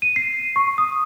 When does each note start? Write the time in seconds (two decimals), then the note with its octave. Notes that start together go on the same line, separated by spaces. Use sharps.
0.02 D#7
0.16 C7
0.56 C#6
0.78 D#6